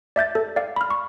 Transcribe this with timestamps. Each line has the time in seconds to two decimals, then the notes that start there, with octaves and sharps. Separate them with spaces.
0.16 D5 E5 G6 A6
0.35 A4
0.56 D5 F5
0.76 B5 F6
0.90 C#6